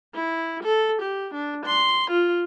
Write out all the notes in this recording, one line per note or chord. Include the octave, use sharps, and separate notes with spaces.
E4
A4
G4
D4
C6
F4